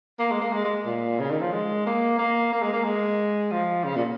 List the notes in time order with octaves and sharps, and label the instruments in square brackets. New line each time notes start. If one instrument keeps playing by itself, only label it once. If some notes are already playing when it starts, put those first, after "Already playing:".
[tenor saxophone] A#3
G#3
A#3
G#3
G#3
A#2
C#3
D#3
F3
G#3
A#3
A#3
A#3
G#3
A#3
G#3
F3
C#3
A#2